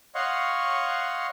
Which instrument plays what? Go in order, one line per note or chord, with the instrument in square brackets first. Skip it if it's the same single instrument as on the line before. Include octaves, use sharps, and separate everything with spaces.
[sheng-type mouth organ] C#5 D#5 F5 F#5 C6 C#6